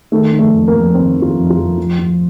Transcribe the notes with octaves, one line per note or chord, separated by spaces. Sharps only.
D#3 A3
D#3
A3
F2
A#3
F2
D#3 C4
D#3
F4
F2
F4
F2
F3
F3